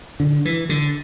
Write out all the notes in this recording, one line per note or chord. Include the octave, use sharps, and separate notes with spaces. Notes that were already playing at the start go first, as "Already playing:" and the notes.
D3
E3
D3